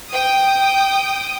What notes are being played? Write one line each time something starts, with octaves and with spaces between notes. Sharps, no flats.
G5 D#6